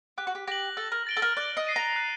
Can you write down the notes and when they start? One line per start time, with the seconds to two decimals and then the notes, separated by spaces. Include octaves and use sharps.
0.18 G4 F#6
0.27 F#4
0.35 G4
0.48 G4 A#6 F#7
0.77 A4 F#6
0.92 A#4
1.07 A6 D7 G7
1.17 A4
1.22 A#4
1.37 D5 F#6
1.57 D#5
1.67 C7 D#7
1.76 A#5
1.96 F#6